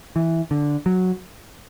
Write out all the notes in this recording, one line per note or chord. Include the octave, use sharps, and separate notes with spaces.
E3
D3
F#3